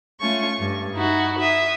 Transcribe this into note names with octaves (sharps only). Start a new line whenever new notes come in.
A3 C#4 F4 C#6
G2
D#4 E4 F#4
E5 D#6